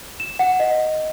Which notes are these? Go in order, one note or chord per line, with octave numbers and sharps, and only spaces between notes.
E7
F#5
D#5